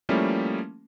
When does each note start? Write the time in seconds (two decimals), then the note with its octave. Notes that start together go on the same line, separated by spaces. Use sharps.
0.09 F3 G3 A3 A#3 C#4 E4